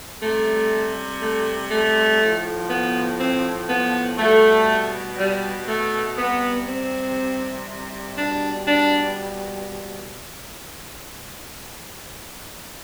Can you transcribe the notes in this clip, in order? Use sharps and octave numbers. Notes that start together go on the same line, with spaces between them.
C3 G3 A3
A3
A3
A2 F3
B3
C4
B3
B2 G3 A3
G3
A3
C3 G3 B3
C4
B2 G3 D4
D4